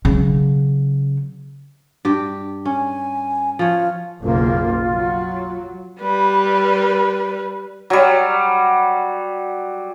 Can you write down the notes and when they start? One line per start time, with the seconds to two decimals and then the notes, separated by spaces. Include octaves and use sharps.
0.05 C#3 F#3
2.05 G2 G4
2.65 C#4 G#5
3.59 F3 F4 C#5
4.22 F#1 B1 A#3 F4
4.93 F#3
6.01 G3 B4
7.90 F#3 G3